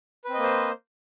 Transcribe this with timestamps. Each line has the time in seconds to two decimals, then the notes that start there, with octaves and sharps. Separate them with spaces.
0.25 B4
0.29 C4
0.34 D#5
0.38 A#3
0.43 C5